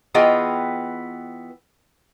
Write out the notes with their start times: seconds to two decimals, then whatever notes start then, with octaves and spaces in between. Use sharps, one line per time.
0.14 E3 B3 F4 G#4 D#5 G5